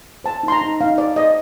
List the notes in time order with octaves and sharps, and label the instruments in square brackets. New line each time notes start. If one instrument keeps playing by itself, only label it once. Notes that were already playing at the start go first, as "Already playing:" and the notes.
[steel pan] C5 A5
D#4 C6
A#5
D#4
D#4 F5
C5 D5
C5 D#5